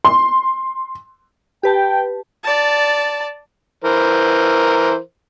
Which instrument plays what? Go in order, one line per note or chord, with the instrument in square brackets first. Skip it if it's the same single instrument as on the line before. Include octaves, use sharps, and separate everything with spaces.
[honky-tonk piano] C6
[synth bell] G4 B4 A5 [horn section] G5
[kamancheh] D5 A5
[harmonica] E3 A#4 C5